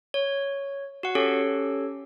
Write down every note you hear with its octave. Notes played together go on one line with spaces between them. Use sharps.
C#5
F#4 F#5
C#4 G4 A4 C#5